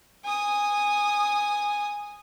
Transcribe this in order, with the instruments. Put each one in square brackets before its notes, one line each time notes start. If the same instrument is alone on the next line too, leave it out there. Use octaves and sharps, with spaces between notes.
[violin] G#5 D#6